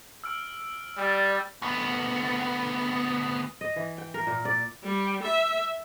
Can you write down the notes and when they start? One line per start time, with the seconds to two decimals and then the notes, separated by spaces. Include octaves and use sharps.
0.24 E6 F6 D7
0.98 G3 D5
1.62 D2 B3
3.61 D#5
3.76 E3
3.98 G5
4.14 A#4
4.27 A#2
4.45 D5
4.83 G3
5.23 E5